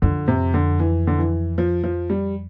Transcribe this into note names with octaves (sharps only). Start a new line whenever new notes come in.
F2 D3
C3
D3
E3
D3
E3
F3
F3
G3